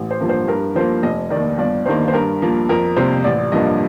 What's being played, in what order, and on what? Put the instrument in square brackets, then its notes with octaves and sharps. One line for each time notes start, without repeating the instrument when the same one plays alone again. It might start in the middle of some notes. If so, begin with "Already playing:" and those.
Already playing: [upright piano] A1
C5
G2 F3 A#3
C5
G2 A#4
F3 A#3 C5
F1 D#5
D#3 D5
D#2
G1 D5
G2 D#3 A#3 C5
C5
G2 A#4
F3 A#3
F2 A#4
C3 G3 A#3 C5
A1 D5
G2 F3 A#3 D#5